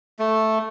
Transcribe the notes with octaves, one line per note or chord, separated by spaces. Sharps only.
A3